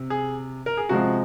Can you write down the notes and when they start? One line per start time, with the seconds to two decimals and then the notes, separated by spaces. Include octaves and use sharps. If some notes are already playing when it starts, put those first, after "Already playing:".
Already playing: C3
0.10 G#4
0.66 A#4
0.77 G#4
0.89 C3 F3 G#3 F#4